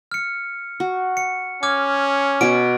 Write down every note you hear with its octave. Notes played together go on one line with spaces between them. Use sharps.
F6 C#7
F#4
C#7
C#4 D6 F6 G#6
B2 F#4 D7